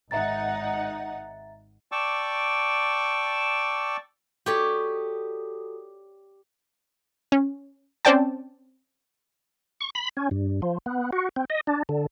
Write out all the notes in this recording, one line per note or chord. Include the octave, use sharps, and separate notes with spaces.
G#1 D#4 E5 F#5 A#5 A6
D5 G5 A5 C#6 D6 E6
F#4 G4 A4 C#5 D5
C#4
C4 C#4 C5 D5 G5 A5
C#6
B5
C#4
G2
F3
B3
F#4
C4
D#5
D4
D3